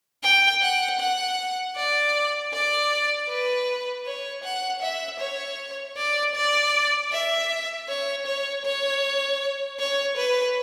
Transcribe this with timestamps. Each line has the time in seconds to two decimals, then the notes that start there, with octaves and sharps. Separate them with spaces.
0.23 G5
0.62 F#5
1.00 F#5
1.76 D5
2.53 D5
3.29 B4
4.06 C#5
4.44 F#5
4.82 E5
5.20 C#5
5.97 D5
6.35 D5
7.12 E5
7.88 C#5
8.26 C#5
8.65 C#5
9.79 C#5
10.17 B4